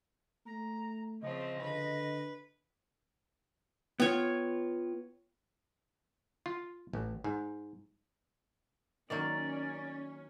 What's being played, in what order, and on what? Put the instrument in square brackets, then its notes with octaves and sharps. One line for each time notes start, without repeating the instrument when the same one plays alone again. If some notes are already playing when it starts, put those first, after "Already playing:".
[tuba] A3 [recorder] A#5
[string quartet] C#3 F3 C4 [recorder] D#5
[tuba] D3 [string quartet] B4
[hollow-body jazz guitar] B3 F4 [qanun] C#5 G5
[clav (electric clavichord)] F4
A1
G#2
[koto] D#3 F#3 A#3 [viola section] C#4 [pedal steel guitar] D5